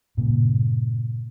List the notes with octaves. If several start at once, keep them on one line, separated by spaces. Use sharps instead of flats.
G2 A#2 C#3